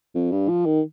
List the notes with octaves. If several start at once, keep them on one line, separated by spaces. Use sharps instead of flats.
F2
G2
F3
D#3